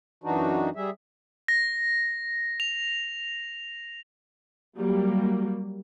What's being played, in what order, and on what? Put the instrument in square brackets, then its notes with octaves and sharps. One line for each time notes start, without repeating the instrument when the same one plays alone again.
[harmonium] F#2 E3 D4 D#4 F#4
G3 G#4 E5
[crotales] A#6
F7
[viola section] F#3 G3 A#3